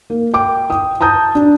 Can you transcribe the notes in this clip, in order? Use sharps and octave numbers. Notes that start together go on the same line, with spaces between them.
A#3
G5 D6
G5 D#6
A5 A#5 D#6 G6
D4